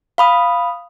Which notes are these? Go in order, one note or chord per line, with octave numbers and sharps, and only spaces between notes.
F5 B5 D#6